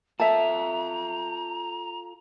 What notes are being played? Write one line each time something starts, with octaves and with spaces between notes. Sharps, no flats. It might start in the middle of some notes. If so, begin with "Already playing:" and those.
F4 A4 E5 A5 A#5